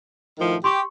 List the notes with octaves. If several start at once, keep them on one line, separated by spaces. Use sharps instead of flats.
A2 D#3 F3
G4 C6 C#6